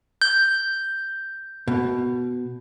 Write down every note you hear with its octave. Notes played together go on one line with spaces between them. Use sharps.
G6
B2